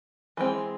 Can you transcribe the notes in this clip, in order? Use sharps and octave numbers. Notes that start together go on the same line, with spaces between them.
E3 G#3 C4